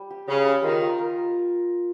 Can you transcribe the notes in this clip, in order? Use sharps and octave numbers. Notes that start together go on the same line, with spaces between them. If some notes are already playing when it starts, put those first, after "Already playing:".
Already playing: G3
G4
C#3 G3
G3
D#3 F4
F4
A#4